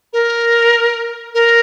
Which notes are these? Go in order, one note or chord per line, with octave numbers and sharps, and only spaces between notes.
A#4
A#4